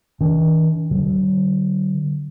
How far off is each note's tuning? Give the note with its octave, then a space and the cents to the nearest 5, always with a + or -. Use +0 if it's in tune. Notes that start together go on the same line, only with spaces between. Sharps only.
D#3 +40 D4 -40
D3 +10 F#3 +40